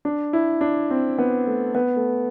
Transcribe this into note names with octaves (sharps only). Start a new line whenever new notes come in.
D4
E4
D4
C4
B3
A3
B3
A3